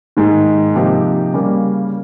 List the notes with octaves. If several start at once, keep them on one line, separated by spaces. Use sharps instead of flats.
G#2 D#3 G#3
C3 F3 A#3 D#4 G4
C#3 G3 A#3